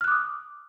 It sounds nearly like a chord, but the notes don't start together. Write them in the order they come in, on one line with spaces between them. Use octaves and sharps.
F6 F#6 D6 D#6